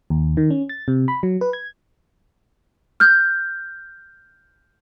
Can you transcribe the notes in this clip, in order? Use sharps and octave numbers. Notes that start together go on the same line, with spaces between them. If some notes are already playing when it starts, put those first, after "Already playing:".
D#2
D#3
C#4
A6
C3
B5
F#3
B4
G#6
F6 G6